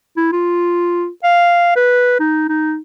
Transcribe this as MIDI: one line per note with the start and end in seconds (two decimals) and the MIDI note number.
0.17 0.31 64
0.32 1.08 65
1.24 1.76 77
1.76 2.19 71
2.20 2.45 63
2.49 2.78 63